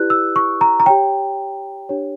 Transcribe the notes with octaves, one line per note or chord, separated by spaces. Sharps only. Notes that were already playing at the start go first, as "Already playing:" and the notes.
Already playing: E4 G4 B4 D5 F#6
E6
C#6
A#5
A#5
G4 C#5 G5
D4 G4 C#5